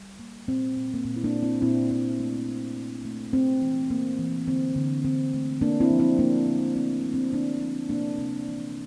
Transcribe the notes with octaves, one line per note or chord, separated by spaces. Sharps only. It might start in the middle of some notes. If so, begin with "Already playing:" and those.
Already playing: G3
A#3
A#2 C4
A#2
A#3
A#2 C4
E4
A#3 D4
A#2
C4 E4
A#2 C4 E4
A#2 C4
A3
A3
A3
A3
A#3 C4
E3
A#3
E3
D3 C4
D3
D3 C4
A3
A#3 D4
C4 E4
F3
C4 E4
F3 A#3 D4
D3
A3 C4
A3
C4
D3 A#3 D4
F3
C3 A#3 D4
C3 C4
E3 A#3